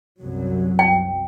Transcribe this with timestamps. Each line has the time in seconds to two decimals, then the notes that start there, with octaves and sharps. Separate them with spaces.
0.21 C2 F#2 F#3
0.79 G5